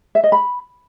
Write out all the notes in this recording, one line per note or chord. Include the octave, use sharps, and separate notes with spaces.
E5
D#5
B5